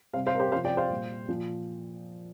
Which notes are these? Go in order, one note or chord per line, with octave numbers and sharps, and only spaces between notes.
C3 G3 C5 F5
C5 F5
A#4
G4 C5
C3 F3 C5 F5
D5 G5
C5 F5
A#2 G3
A#2 F3